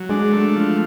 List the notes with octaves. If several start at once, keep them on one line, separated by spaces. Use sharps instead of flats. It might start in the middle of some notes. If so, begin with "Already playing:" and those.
Already playing: F#3
G#3 D4
A3
F3